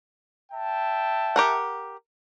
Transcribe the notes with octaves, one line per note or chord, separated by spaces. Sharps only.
E5 G5 A5
G4 A#4 F#5